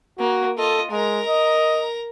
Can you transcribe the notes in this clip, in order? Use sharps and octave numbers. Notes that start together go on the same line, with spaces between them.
A#3 F#4
F4 A4 D#5
G#3 A#4 A#5
D#5